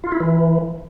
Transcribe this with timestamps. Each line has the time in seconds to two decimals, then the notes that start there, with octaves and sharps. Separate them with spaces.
0.04 F4
0.12 E4
0.20 E3